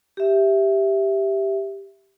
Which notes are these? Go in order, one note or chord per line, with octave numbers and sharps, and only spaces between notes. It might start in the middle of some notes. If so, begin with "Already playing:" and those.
G4 E5